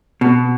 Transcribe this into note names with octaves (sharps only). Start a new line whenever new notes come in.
B2